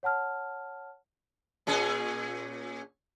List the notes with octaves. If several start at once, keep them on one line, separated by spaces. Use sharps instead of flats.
C#5 F#5 A5 F6
A#2 C#4 G#4